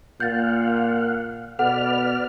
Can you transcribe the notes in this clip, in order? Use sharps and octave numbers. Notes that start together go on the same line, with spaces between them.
A#2 F5 F#5 G6 A6
B2 A4 B4 D5 F#5 F6